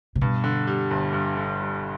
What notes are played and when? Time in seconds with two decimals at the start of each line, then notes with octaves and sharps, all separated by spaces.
0.15 C3
0.21 G2 B2
0.44 D3
0.67 G3
0.91 G1
1.13 G2
1.37 D3
1.60 G3